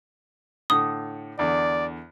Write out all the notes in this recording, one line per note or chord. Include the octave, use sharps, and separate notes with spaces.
A2 D3 D#6
E2 D3 D5